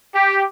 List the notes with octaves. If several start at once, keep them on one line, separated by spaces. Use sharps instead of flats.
G4